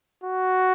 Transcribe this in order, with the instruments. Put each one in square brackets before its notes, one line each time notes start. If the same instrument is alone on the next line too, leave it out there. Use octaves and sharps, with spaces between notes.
[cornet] F#4